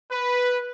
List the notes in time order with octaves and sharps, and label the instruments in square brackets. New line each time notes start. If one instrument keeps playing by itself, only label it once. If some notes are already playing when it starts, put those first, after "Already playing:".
[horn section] B4